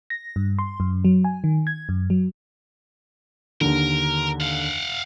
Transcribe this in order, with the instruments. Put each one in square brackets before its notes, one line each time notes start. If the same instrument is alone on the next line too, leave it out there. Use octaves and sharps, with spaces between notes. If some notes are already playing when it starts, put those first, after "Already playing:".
[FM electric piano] A#6
G2
C6
F#2
F#3
G#5
D#3
G#6
F#2
F#3
[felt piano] D#2 D3 [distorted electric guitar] A#4
[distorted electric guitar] F5 F#5